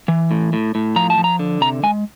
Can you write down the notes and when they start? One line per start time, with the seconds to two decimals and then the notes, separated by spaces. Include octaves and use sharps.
0.08 E3
0.31 A2
0.53 A2
0.75 A2
0.96 F3 A#5
1.10 A5
1.18 F3
1.24 A#5
1.39 D3
1.61 C3 A#5
1.83 G#3 G#5